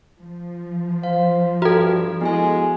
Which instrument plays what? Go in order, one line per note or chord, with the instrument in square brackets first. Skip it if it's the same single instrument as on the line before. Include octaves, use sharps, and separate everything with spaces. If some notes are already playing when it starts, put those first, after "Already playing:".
[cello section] F3
[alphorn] C5 [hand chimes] F5
[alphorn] G2 [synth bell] F#4 A4 [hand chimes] A#5
[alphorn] G#3 [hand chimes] B3 E4 G#5